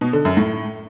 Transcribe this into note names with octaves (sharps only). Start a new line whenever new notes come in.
B2
D3
F#2
A2